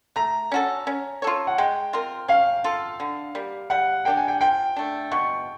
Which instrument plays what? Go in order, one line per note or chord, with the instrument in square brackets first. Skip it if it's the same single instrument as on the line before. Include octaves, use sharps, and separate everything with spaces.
[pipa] A3 [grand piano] A#5
[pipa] C#4 F#4 A4
C#4
F4 A4 C#5
[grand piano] F#5
[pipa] G#3 [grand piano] G5
[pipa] C4 F4 A#4
[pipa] C#4 [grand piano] F5
[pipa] F4 A4
D3
G3 A#3
[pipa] G3 [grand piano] F#5
[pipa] A#3 D4 G4 [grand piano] G5
[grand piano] G#5
G5
[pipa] F3 [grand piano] G5
[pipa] A3 D4
[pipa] B2 [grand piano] C#6